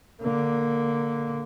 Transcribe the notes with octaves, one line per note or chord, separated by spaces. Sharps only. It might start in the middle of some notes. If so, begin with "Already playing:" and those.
D3 A#3